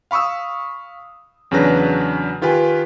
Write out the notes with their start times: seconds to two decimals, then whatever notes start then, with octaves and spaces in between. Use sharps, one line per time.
0.11 F5 B5 C#6 D#6 E6
1.51 E2 C#3 F#3 D4 B4 A#6
2.42 D#3 F4 G4 B4 G#5